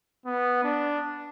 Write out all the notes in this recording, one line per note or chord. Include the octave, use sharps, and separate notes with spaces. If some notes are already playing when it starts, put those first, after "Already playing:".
B3
D4